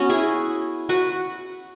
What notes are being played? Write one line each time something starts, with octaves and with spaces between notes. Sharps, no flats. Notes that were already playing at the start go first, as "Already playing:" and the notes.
Already playing: B3 C#4 F#4
E4 G#4
F#4 B4